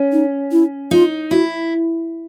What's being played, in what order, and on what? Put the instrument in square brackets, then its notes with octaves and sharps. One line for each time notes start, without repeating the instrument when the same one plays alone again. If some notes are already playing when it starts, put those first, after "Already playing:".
Already playing: [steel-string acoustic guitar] C#4
[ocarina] D#4
E4
[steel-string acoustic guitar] D#4 [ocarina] F4
[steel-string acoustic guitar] E4 [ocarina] F#4